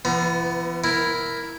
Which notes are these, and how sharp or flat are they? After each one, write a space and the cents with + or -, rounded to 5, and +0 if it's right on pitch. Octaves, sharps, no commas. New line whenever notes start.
E3 +40 B3 +10 A#5 +30
E4 +0 A#4 +0